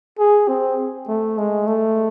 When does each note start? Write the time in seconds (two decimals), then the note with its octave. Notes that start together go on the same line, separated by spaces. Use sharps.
0.19 G#4
0.48 C4
1.08 A3
1.38 G#3
1.67 A3